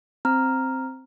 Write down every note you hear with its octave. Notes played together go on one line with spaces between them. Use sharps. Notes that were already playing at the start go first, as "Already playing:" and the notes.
C4 A#5 F6